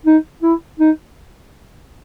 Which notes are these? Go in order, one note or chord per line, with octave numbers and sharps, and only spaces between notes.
D#4
E4
D#4